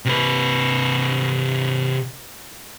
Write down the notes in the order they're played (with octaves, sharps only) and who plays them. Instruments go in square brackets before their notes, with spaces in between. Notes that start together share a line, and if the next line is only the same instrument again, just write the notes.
[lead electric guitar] C3 B4